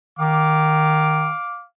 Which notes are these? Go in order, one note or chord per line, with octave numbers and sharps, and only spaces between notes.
D#3 F5 D6